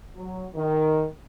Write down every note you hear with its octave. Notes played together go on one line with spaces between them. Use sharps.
F#3
D#3